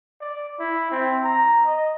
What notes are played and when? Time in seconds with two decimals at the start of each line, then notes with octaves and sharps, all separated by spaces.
0.21 D5
0.60 E4
0.92 C4
1.24 A#5
1.65 D#5